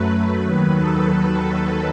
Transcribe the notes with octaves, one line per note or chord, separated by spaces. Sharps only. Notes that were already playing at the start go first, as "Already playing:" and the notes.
Already playing: F#2 F#3 A3 B4
D#2 D#3 F#3 B4
A4
B4